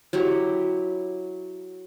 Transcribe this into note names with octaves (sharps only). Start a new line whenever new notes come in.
F#3 E4 G4